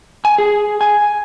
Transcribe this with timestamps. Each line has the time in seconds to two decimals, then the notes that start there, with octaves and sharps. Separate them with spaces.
0.25 G#5
0.38 G#4
0.81 G#5